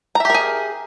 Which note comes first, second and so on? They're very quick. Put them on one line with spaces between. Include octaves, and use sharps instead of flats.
A#5 E5 G4 A#4 G#4